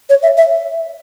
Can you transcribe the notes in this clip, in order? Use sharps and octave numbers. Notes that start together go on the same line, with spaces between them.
C#5
E5
E5